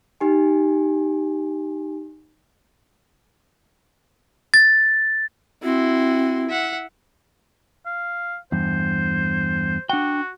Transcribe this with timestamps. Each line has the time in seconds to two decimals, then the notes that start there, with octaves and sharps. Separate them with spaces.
0.21 D#4 G4 G#5
4.54 A6
5.63 C4 E4 F#4 C6
6.49 E5 F#5
7.86 F5
8.52 E2 G2 C5
9.90 D4 F#4 F#5 G5